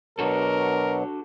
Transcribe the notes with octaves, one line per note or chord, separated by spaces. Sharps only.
B2 F#3 D4 F#4 A4 A#4